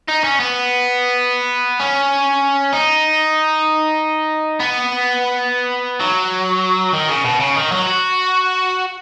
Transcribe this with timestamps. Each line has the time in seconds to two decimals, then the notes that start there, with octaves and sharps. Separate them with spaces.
0.08 D#4
0.24 C#4
0.40 B3
1.80 C#4
2.73 D#4
4.60 B3
6.00 F#3
6.93 D#3
7.09 C#3
7.25 B2
7.40 C#3
7.56 D#3
7.72 F#3
7.87 F#4